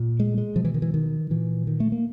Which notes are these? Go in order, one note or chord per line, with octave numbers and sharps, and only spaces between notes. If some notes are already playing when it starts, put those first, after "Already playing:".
Already playing: A#2
G#3
G#3
B2 F3
E3
D#3
E3
D#3
A#2 E3
D#3
A3
A#3